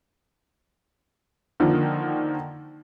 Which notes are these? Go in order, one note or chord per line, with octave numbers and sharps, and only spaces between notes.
D3 D#3 F3 A#3